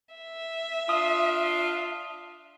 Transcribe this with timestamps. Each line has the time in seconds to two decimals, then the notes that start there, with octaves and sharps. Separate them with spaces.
0.15 E5
0.89 D4 F4 D#6